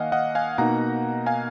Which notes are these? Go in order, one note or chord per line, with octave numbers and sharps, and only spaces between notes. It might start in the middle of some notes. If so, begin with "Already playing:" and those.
Already playing: D#3 A#3 D#5 F5 F#5 G#5
D#5 F#5
F5 G#5
B2 A#3 D#4 F#5 A#5
F5 G#5